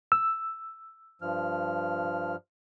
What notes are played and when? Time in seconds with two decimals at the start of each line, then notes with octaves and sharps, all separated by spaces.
0.12 E6
1.22 G2 F3 F6